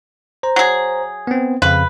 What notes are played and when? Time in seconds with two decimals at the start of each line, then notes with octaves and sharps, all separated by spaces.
0.43 C5 A#5
0.56 F#3 G#4
1.27 B3 C4
1.62 F2 C#3 B4 F5